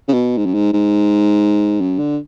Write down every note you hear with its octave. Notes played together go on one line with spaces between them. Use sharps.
C#3
B2
G#2
F#2
G#2
G#2
F#2
D3